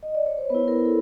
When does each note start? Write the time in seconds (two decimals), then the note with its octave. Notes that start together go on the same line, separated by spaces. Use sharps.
0.03 D#5
0.15 D5
0.26 C#5
0.38 C5
0.50 B3 E4 B4
0.68 A#4
0.85 A4